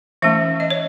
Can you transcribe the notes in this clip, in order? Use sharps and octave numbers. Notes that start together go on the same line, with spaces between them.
E3 A3 C#4 E5
D#5
C#5